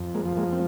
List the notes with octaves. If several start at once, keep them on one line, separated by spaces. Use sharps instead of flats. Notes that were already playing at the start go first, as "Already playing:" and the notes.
Already playing: F2
G#3 A#3
F3
G#3 A#3
C4